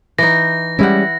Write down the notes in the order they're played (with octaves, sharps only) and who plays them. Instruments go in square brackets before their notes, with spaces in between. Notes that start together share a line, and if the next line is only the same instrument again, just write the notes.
[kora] E3 D#4 [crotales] A#6
[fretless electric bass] G3 G#3 C#4 [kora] E4 F#5